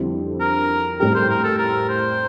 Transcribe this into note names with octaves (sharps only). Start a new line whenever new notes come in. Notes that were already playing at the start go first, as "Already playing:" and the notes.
Already playing: F2 D3 G3 C4 E4
A#4
A2 G3 C4 G4 A#4
C5
A#4
A4
A#4
C5